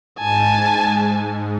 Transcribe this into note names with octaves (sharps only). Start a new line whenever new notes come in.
G#2 G#5 A5